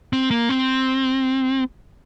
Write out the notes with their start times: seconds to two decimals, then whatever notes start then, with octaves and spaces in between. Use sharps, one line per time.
0.13 C4
0.31 A#3
0.49 C4